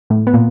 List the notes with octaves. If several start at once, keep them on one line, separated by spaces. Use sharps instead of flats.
A2 A3
B3
A#2 A#3